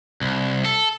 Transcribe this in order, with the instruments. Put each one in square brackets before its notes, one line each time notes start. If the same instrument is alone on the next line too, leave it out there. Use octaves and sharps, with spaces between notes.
[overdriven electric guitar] C2
A4